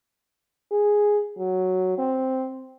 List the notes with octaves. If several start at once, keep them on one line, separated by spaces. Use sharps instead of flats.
G#4
F#3
C4